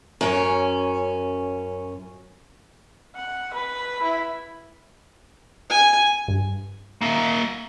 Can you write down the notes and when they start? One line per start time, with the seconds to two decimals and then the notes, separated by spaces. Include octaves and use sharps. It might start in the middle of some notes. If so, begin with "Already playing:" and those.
0.21 F#2 C#4
3.16 F#5
3.54 B4
4.03 E4
5.70 G#5
6.28 G2
7.01 A#3 E5